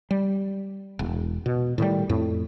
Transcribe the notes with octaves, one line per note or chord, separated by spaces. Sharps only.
G3
E1
B2
A2 D#3 E3 G3
F2 A2